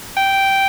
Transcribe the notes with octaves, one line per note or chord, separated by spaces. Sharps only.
G5